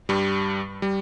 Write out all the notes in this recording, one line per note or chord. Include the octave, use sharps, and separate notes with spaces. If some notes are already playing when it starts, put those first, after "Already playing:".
G2 G3
G3